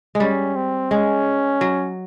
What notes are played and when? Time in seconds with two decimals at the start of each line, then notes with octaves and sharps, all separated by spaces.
0.15 G#3
0.20 G3 C#4
0.55 C4
0.91 G#3 C#4
1.61 F#3